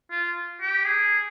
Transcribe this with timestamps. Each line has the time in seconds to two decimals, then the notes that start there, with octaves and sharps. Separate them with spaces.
0.11 F4
0.61 G4
0.86 G#4